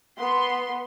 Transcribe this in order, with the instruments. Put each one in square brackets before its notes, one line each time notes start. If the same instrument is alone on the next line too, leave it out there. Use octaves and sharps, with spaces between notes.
[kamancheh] B3 [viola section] C6